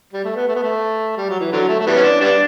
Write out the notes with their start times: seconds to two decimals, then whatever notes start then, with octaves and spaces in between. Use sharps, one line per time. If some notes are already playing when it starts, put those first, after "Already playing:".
0.13 G3
0.24 A3
0.36 B3
0.47 A3
0.55 B3
0.62 A3
1.17 G3
1.29 F#3
1.40 E3
1.52 D3 F#3
1.69 A3
1.79 A3
1.87 E3 G3 B3
1.95 C#4
2.04 D4
2.21 G3 B3 D4